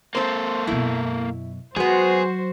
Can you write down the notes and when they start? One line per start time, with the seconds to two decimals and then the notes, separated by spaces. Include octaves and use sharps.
0.15 A#3 C4 A4 C5
0.67 F#2 B2 E4
1.76 F#3 G#3 B3 F#4 G#4 C5